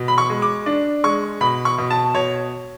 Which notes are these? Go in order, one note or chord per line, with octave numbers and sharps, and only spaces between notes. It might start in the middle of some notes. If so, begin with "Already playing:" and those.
Already playing: B2
B5
C#6
G#3
D6
D4
G#3 C#6
B2 B5
C#6
B2
A5
B2 C#5